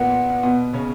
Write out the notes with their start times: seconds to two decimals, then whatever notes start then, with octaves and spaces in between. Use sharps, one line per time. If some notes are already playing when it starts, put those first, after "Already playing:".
Already playing: A#2 A#3 B3
0.43 B2 B3
0.73 C#3 C#4